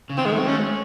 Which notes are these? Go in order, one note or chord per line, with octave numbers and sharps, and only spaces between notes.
C#3
D#3 C4
G#3
A3
F#3 C4
A3 C#4
G#3